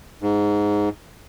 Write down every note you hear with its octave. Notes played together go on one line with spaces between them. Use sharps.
G#2